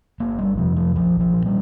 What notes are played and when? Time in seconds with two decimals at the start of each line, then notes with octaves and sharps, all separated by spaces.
0.20 G1 A#3
0.39 G3
0.57 F2 C3 F3
0.77 F3
0.95 A#1 F3
1.20 F3
1.33 A#2
1.46 G3